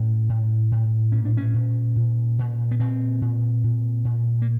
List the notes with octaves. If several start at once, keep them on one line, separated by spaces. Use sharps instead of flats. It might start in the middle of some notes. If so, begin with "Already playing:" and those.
Already playing: A2 C#4
A2
A2
A#2 C#4
D4
C#4
A#2
A#2
A#2
B3
A#2 C4
A#2
A#2
A#2
A#3